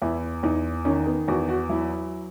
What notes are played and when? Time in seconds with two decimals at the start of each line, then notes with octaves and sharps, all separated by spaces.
0.02 E2 E4
0.43 E2 D#4
0.85 D#3 C#4
1.07 B3
1.28 E2 F#4
1.49 F#4
1.69 F#3 E4